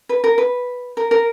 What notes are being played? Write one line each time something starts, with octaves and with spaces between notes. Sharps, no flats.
B4
A#4
B4
A#4
A#4